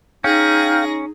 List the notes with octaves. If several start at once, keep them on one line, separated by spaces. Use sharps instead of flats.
C#4 D#4 G#4 F5 G5 A#6